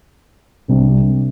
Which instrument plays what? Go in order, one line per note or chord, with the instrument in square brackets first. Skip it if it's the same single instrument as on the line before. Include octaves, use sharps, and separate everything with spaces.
[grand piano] C2 C3 G3 D4